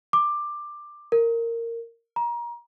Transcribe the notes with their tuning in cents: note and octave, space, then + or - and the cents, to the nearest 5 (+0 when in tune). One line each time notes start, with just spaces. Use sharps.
D6 +15
A#4 -15
A#5 +30